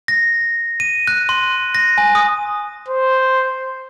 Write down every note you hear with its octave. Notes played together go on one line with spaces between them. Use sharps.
A#6
D#7
F#6
C6
A#6
G#5
D#6
C5